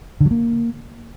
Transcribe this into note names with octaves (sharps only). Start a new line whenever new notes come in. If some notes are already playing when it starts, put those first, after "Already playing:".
D3
F#3
A#3